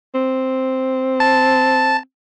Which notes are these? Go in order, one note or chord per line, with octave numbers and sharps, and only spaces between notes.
C4
A5